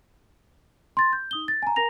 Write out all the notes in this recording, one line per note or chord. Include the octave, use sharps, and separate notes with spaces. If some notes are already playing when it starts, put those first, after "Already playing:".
C6 A6
G6
D#4 D#6 G7
A6
G#5 A#5
A#4 G#5 A#5 A#6 F7